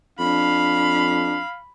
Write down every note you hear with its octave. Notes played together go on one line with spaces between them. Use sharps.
F2 D4 F5 B5